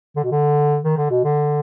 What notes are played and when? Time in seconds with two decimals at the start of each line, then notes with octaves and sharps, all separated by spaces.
0.16 D3
0.24 B2
0.31 D3
0.83 D#3
0.97 D3
1.10 B2
1.24 D3